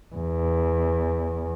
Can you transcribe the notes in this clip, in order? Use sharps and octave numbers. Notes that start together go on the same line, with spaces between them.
E2